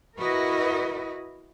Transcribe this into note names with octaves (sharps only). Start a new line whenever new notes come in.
E4 F#4 A#4 B4 D#5